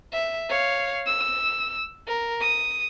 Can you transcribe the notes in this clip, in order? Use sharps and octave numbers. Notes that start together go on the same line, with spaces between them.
E5
C#5 F5
E6
A#4
D#6